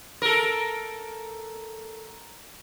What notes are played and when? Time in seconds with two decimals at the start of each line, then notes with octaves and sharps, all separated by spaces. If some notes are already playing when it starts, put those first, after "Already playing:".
0.22 A4 A#4